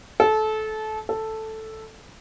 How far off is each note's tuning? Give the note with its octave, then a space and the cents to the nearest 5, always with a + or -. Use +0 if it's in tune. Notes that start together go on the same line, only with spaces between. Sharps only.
A4 -25
A4 +0